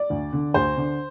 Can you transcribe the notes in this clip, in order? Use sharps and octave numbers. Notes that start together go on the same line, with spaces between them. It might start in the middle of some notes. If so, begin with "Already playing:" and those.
Already playing: D5
D2
D3
D2 C5
D3